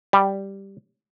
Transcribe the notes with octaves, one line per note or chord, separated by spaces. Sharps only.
G3